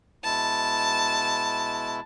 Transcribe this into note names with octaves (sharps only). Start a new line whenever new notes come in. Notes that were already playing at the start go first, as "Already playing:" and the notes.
B2 G#3 E4 A5